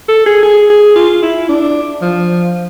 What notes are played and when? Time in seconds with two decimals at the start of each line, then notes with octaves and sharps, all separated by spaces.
0.08 A4
0.26 G#4
0.43 G#4
0.70 G#4
0.96 F4
1.23 E4
1.49 D4
2.02 F3